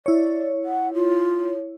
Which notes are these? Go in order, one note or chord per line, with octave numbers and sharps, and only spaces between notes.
E4 C#5 D5
F#5
F4